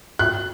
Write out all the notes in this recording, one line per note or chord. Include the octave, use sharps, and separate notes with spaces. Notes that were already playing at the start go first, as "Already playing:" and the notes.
F#6